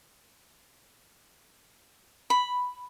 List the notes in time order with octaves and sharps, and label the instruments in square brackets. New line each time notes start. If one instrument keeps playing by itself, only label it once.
[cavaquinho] B5